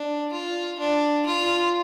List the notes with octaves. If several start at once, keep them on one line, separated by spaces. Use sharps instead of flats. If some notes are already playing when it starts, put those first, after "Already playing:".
Already playing: D4
F4
D4
F4